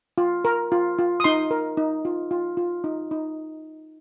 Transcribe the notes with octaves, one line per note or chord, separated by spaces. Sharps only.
F4
A#4
F4
F4
D#6
D#4 C6
A#4
D#4
F4
F4
F4
D#4
D#4